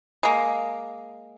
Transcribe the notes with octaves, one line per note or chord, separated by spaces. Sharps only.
G#3 A#3